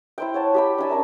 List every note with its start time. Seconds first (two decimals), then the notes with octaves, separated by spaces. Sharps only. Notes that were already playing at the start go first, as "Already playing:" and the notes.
0.18 E4 C5 G5
0.34 C#5 F#5 A5
0.54 G4 G5 B5
0.78 D4 G#5 A5
0.90 C#4 D4 A#4 E5